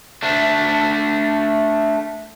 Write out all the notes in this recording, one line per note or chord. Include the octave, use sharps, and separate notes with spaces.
A3 D4